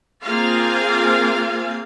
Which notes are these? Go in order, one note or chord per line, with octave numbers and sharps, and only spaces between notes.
A#3 C4 F4 G#4 F5